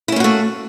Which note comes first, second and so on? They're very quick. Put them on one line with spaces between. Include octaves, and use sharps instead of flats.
E4 C#4 A#3 F#4 A3